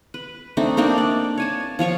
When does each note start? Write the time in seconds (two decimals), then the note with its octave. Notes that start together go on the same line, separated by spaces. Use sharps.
0.14 B4
0.57 A3 C4 D4 D#4
0.77 A#3 C4 D4 D#4
0.98 D5
1.38 C#5 G#5 A5
1.79 F3 F4 C#5 C#6